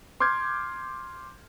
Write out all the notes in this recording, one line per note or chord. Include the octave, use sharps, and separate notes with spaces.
C6 D6 F6 G6 G#6